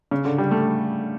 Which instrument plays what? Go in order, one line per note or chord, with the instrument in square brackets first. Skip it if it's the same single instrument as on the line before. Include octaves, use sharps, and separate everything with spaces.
[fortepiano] C#3
D3
G3
A3